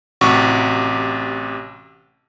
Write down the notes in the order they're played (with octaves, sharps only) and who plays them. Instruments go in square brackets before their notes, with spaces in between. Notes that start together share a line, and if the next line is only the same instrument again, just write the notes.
[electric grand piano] A1 C3 F#4 G4 C#6